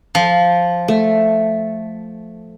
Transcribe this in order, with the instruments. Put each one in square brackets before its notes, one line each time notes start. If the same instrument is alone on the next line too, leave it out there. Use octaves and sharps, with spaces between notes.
[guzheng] F3
[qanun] A3